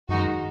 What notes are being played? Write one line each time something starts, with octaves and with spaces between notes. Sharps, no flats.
F#2 D#3 G#3 D#4 F#4